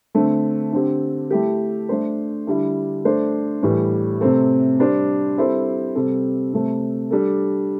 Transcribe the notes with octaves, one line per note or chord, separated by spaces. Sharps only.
D3 A3 C4
D3 C4 G4
A3 E4 G4
A3 D4 C5
D3 G3 E4
A3 D4 A4 C5
A2 E3 G3
C3 A3 C4 A4
G3 D4 C5
G3 C4 E4 A4 C5
C3 G3 C4 A4
C3 A3 C4
G3 D4 A4